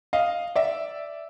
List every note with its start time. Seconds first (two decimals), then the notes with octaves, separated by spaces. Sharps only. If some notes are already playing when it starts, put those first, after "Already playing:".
0.13 D#5 F5
0.56 D5 E5